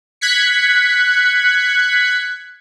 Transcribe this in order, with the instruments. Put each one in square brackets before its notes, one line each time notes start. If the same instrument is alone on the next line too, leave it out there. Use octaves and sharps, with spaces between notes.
[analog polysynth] F#6 G#6 B6 C#7